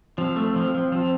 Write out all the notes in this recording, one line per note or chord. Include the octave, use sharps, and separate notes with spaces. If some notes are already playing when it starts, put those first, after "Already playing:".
F3 C4
A3
F3
F3
F3